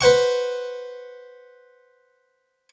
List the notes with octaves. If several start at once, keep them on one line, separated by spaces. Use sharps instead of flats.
B4 C5 F#5 C#6